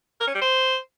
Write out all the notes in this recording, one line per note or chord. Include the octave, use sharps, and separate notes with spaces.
A#4
C#4
G3
C5